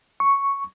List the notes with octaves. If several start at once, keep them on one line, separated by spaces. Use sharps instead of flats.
C#6